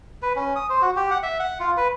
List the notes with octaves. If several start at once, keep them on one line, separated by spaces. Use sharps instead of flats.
B4
C#4
D#6
C5
F#4
G4
F#5
E5
F#5
F4
B4